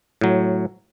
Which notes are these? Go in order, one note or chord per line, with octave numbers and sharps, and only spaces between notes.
A2 F#3